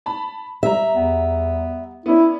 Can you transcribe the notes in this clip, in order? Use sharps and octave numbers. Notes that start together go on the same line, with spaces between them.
A5 B5
G3 E5 A#5
E2 B3
B3 C#4 D4 E4